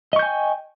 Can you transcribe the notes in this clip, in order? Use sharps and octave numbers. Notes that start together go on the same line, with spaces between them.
D#5 G5 G#5 C#6 G6